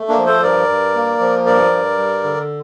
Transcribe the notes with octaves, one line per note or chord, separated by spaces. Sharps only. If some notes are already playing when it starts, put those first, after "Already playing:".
Already playing: A3
A#3 D4
F3
A4 C5
G2 A#4 D5
G2
A#3
F3
G2 A#4 D5
G2
G3
D3